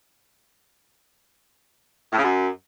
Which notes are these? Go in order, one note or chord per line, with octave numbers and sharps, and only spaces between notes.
A2
C#3
F#2